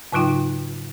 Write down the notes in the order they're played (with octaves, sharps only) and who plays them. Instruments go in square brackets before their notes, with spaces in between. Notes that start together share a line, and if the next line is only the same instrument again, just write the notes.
[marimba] G#2 C#3 F#3 D#4 F4 G5